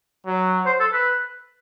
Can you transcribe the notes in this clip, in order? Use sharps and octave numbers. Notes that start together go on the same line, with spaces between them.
F#3
C5
A4
B4